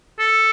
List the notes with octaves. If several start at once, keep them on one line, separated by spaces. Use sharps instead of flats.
A4